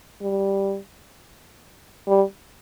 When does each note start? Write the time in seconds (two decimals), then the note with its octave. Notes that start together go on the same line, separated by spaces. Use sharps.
0.22 G3
2.08 G3